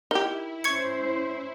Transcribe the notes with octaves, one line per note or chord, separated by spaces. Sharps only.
D#4 E4 G4 A#4
C#4 C5 C#6 G#6 C#7